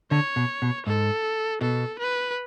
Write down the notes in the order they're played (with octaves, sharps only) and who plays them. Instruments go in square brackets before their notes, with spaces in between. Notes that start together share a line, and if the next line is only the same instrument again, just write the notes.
[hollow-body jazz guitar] D3 [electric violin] C#5
[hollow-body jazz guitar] B2
B2
[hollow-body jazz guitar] G#2 [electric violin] A4
[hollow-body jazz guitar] B2 [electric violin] A4
[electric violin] B4